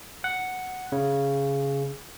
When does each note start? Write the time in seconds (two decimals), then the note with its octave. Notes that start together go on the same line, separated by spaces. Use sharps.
0.24 F#5
0.92 C#3